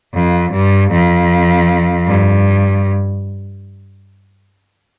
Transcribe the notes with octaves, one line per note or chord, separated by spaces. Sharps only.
F2
G2
F2
G2